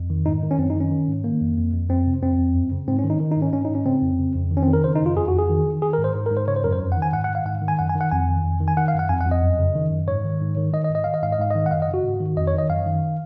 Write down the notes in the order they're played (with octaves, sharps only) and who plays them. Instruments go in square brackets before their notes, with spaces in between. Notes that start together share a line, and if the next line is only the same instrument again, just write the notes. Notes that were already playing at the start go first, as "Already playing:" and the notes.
Already playing: [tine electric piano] F2
D#3
G#2 D#4
D#3
C#4
F#2 C4
D#4
D#3
C#4
D#3
G#2
D#3 A#3
F2
F2
F2
F2 C4
C3
F2 C4
F2
F#2
C#3
G#2 C4
C#4
D#3
D#4
D#3
D#4
G#2
C#4
G#2 C#4
D#4
G#2
C#4
C#3 C4
F2
C#3
F2
D#3
C#4
C4
D#3
A#4
C#3 C5
D#4
F#2
F4
F2 G#4
F#4
F2
G#4
D#3
D#3
D#3 G#4
A#4
G#2
C5
G#2
A#4
G#2
C5
C#3 C#5
C5
F#2 A#4
C5
F2
F#5
D#3
G#5
G#2 F#5
F#5
D#3
F5
G#2 F#5
D#3
G#5
F#2 F#5
G#5
D#3
F#5
F2 G#5
D#3
F2
D#3
G#5
D#3 F#5
F5
F#2
F#5
F2 G#5
F#5
F2
D#5
F#2
C#3
D#3
F#2
G#2 C#5
D#3
G#2
D#3
D#3 D#5
D#5
G#2
D#5
D#3 F5
D#5
G#2 F5
D#5
G#2 F5
D#3 D#5
F#5
F#2 F5
D#5
C#3
F#4
G#2
D#3
F2 D#5
C#5
D#3 D#5
F#2 F5
D#3